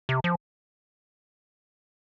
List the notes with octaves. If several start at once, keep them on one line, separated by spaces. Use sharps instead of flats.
C3
F3